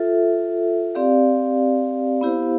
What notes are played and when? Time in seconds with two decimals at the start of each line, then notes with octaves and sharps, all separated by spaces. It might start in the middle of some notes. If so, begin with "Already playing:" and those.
Already playing: F4 A4 E5
0.95 C4 G4 D5 F5
2.21 B3 E4 G4 C5 F5